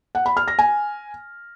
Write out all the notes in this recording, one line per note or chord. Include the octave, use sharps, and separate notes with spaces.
F#5
B5
F6
A#6
G#5